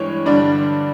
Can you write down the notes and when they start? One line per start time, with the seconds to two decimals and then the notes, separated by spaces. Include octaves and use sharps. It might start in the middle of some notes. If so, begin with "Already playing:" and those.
Already playing: G2 E3 G#3 C#5
0.26 G2 D3 G3 D5